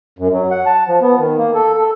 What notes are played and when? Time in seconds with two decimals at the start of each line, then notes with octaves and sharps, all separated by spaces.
0.19 F#2
0.33 F#3
0.51 F#5
0.66 A5
0.88 F3
1.01 B3
1.19 D#3
1.38 A#3
1.54 A4
1.77 A4